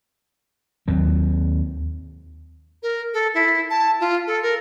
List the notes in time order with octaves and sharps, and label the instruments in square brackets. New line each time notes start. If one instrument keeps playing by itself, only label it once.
[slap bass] D#2 F#3 C4
[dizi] A#4
A4
E4
A5
F4
A4
A#4